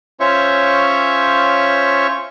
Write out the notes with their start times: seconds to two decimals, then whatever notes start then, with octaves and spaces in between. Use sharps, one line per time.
0.20 C#4 F4 C5 C#5 E5 C#6